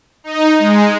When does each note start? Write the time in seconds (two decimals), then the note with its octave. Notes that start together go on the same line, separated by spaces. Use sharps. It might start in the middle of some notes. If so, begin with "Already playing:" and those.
0.24 D#4
0.59 G#3